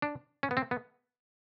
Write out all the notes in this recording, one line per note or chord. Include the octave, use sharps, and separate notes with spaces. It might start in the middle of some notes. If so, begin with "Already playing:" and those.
D4
C#4
B3
C4
B3